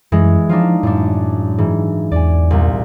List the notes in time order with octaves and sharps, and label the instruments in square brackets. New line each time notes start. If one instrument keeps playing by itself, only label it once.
[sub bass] F#2 [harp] E3 G#3
[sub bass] F3 [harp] D4 D#4 F4
[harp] F#2 D4 [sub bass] A2
[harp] G#2 E3
[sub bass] E2 [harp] D5 G#5
[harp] C2 A#2